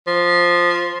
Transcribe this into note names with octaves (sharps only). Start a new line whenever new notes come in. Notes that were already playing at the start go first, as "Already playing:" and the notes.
F3